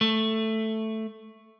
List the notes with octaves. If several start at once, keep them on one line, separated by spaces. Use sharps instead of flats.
A3